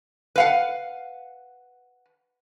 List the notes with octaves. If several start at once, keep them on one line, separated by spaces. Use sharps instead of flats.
B4 F5 F#5